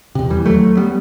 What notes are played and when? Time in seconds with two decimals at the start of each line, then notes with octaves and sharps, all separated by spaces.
0.15 E2 C3
0.30 E3 G3
0.46 D#2 F#3 A3
0.77 G3 B3